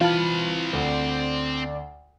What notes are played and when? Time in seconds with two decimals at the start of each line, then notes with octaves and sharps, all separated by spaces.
0.01 E3 C4 F4 F5 A5 B5 F6
0.73 D2 D5